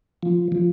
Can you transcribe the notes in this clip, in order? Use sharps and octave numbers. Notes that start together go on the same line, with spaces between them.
F3
F3